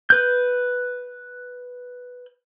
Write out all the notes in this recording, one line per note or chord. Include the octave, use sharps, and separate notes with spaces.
B4 G6